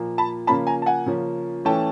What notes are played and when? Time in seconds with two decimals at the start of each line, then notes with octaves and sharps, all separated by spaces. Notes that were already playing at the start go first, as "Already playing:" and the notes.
Already playing: A#2 F3 A#3
0.18 A5 B5
0.47 C#3 F3 A#3 C#4 A5 B5
0.67 G#5 A#5
0.82 A5
0.86 F#5 G#5
1.06 C#3 F3 A#3 C#4
1.65 E3 A3 C#4 G5 A5